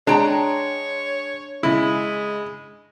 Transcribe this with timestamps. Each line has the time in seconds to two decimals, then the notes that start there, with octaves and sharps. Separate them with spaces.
0.07 G#3 D4 C#5 G5 A#5
1.63 C#3 G#3 E4